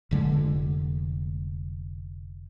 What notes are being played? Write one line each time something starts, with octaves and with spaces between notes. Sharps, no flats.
F1 D3 G#3